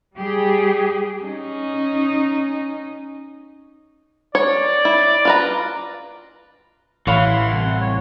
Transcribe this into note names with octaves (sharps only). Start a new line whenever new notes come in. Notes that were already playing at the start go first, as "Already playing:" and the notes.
G3 G4 G#4
C#4 D#4
C#5 D5
E4
F4 B4 A#5
A1 E3 C#5 F5 F#5 B5 C6
C2
C#5